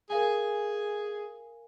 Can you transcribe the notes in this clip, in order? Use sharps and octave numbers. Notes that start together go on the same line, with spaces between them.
G#4 A#4 F5 G#5